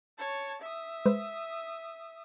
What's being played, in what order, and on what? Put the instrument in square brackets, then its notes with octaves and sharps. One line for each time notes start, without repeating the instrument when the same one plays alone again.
[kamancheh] C#5 A5
E5 D#6
[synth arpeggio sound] G#3 B4 C5